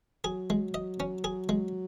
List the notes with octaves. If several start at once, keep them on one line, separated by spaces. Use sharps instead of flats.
F#3 G#4
G#3
D#5
C#4
G#4
G#3